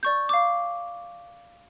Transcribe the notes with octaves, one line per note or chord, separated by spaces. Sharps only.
D5 C#6 G6
F5 D6